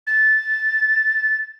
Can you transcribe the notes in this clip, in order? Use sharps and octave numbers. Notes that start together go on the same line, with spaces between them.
A6